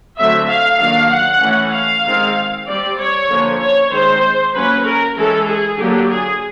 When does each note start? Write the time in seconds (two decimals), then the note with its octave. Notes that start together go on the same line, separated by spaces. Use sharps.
0.18 D3 F#3 A3 C4 E5
0.49 F5
0.80 D#3 F#3 A#3 D4 F5
1.11 F#5
1.42 E3 A3 C#4
1.73 F5
2.05 D#3 G#3 C4
2.67 G3 C4 D5
2.99 C#5
3.29 D3 F3 A#3 C#4
3.61 C#5
3.92 D#3 G#3 C4 C5
4.54 F#3 A#3 C#4 B4
4.85 A#4
5.16 E3 G#3 C#4 A4
5.47 G#4
5.78 D3 F#3 A#3 D4 G4
6.09 G#4